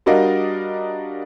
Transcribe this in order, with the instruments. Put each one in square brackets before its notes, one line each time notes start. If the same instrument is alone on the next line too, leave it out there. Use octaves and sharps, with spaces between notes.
[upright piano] G3 D4 F#4 A#4 D#5 F5